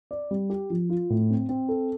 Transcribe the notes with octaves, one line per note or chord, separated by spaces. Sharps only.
D5
G3
G4
F3
F4
A2
C4
C4
A4